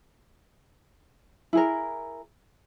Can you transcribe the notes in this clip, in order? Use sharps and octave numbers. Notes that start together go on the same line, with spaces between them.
E4 G#4 A#4